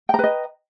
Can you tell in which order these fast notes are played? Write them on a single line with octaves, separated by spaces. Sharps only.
G5 A#5 B4 D#5